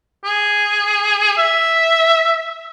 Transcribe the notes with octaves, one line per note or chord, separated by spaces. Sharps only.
G#4
E5